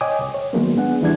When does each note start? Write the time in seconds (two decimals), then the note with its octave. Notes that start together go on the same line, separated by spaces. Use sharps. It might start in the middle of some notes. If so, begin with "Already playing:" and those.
0.01 C#5 D#5 G5 G#5 D6 D#6
0.21 C2
0.34 C#5
0.53 D#3 F#3 G#3 A#3 B3
0.77 B3 D4 G#4 F#5
1.01 D#2 E3 G3 D4 G#6